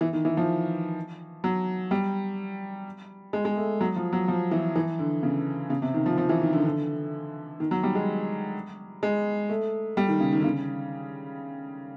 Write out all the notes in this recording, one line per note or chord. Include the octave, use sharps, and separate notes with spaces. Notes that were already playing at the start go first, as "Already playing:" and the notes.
E3
D#3
E3
F3
F#3
G3
G#3
G#3
A3
F#3
F3
F#3
F3
E3
E3
D3
C#3
C#3
C3
D#3
F3
F3
E3
D#3
D3
D3
D#3
F#3
G3
G#3
G#3
A3
G3
D#3
C#3
D#3
D3
C#3